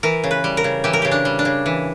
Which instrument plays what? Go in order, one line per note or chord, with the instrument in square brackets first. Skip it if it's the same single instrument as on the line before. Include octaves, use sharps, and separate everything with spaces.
[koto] E3 A#4
C#3
B4
G3
A#4
C#3
E3 G4
A#4
C#3 G4
D4
G3
D4
C#3
E3